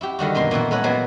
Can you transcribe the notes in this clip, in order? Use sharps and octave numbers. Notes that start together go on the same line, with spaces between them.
E4 F#4 G4
D3 D#3 G3 F#4
F#2 B2 A#3 C6
A#2 E3 B3 F#4
G#3 A4 B4 C#5 F#5
A#2 F#3 A#3 B3